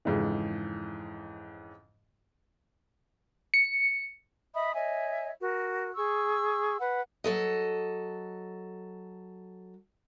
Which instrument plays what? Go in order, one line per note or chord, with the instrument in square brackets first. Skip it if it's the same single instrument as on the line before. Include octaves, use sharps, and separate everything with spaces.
[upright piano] F2 G#2 C#3 E3
[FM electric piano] C#7
[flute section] D#5 E5 B5 D#6
C#5 D#5 E5 G#5
F#4 A#4
G#4 C#6 E6
B4 F#5
[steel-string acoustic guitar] F#3 A4 D#5